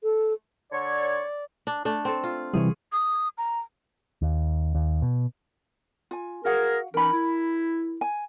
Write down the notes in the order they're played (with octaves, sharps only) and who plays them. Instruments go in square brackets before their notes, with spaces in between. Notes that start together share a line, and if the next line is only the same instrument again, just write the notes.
[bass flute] A4
[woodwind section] D3 C#5 C#6 [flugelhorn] D5
[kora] D4
A3 D4
C4 A4
F4
[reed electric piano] C3 E3 G3 [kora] G#4 C#5
[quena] D#6
A#5
[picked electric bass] D#2
D#2
B2
[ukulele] F4 G#5
[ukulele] F#4 F5 F#5 [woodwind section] G#4 A#4
[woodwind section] E3 C#4 D#4 [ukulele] A#4 B5
[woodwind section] E4
[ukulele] G#5